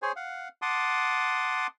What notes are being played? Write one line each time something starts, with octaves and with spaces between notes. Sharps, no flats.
G#4 C5 C#5 G#5
F5 F#5
F#5 A5 C6 D6 D#6